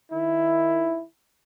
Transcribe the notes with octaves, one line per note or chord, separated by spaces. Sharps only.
D#3 E4